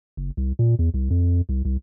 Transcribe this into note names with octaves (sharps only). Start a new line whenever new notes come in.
F#1
C2
A#2
E2
C2
F2
C2
C2